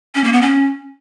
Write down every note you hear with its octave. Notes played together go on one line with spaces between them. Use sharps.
C#4
A#3
B3
C#4